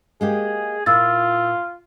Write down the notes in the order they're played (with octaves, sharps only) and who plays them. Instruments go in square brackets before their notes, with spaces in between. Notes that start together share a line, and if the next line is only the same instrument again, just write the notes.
[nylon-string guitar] G#3 A#3 G4 [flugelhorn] G#4
[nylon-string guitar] A#2 E4 [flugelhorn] F4 [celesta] E6 A6